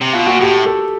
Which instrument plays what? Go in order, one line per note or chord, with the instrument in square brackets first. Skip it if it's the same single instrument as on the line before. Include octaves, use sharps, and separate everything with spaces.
[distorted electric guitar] C3
[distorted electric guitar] B2 [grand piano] F4
[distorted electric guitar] A#2 [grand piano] F#4
[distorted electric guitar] A2 [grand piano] G4
[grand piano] A4